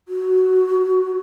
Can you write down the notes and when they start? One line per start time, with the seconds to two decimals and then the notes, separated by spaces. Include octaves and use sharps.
0.08 F#4